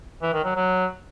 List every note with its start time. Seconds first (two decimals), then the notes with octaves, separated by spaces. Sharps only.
0.22 E3
0.33 D#3
0.44 F#3
0.56 F#3